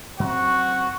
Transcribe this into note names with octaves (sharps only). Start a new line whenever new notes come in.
F#2 C4 F#4